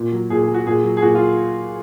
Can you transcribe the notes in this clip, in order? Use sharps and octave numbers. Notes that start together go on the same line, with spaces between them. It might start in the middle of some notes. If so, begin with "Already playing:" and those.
Already playing: A#2
F#3
A#2 G#4
G#4
F#3
F#4
A#2 G#4
F#3
G#4
A#2 F#4
F4